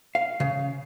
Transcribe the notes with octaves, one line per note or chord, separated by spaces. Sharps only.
F5
C#3